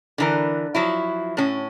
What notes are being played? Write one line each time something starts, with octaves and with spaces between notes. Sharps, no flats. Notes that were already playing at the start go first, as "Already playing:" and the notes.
D3 E3 A#4
F3 F#3 E4
A2 C#4